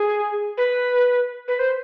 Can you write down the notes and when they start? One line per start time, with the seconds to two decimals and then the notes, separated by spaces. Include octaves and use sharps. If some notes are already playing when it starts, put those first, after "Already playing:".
Already playing: G#4
0.58 B4
1.48 B4
1.59 C5